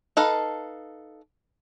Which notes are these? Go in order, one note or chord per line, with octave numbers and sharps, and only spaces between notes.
D#4 A4 B4 F5